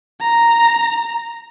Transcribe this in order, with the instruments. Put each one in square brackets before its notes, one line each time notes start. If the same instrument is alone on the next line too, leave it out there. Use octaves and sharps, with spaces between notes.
[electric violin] A#5